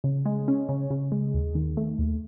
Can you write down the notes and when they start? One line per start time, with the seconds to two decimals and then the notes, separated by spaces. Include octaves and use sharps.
0.04 C#3
0.26 G#3
0.48 C#4
0.69 C#3
0.91 C#3
1.12 G#3
1.34 D#2
1.55 D#3
1.77 A3
1.99 D#2